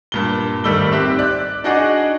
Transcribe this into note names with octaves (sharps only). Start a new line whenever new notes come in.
G2 A#2 G7
G#1 D#3 G3 A3 E6 G7
C4 G4 E5 F#6
D5 F#6
D4 D#4 F#4 G#4 D5 D#5